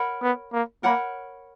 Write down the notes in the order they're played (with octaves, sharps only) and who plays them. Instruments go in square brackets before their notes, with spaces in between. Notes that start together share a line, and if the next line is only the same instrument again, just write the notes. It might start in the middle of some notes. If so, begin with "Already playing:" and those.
Already playing: [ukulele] A#4 C#5 F#5 B5
[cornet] B3
A#3
[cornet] A#3 [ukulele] A#4 C#5 F#5 B5